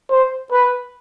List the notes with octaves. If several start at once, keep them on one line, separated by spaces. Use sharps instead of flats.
C5
B4